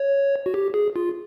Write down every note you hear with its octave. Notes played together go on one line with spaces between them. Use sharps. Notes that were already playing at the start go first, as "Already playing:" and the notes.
Already playing: C#5
F#4
G4
G#4
F4